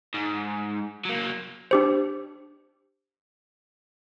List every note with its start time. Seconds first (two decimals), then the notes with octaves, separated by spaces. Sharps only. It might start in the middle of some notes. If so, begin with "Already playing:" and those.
0.14 G#2
1.05 F#3 A#3
1.71 D4 G4 C5